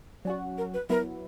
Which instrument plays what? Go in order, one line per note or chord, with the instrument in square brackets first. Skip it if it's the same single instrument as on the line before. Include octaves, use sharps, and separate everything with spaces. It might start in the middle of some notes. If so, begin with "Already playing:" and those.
[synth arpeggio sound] F#3 C#4 F#4 [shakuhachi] D5
[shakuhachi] A#4
B4
[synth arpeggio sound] F#3 B3 E4 [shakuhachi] A#4